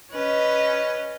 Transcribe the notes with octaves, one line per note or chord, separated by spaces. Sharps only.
C#4 B4 D#5